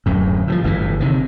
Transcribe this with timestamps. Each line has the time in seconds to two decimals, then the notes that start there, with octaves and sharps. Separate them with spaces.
0.06 D1 F#2 A2
0.47 A2 E3 F3
0.64 G1 A2 D#3 E3
1.00 C3 D#3